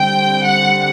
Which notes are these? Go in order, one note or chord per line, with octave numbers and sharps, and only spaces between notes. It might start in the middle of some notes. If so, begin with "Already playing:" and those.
Already playing: D3 G3 C4 G5
F#5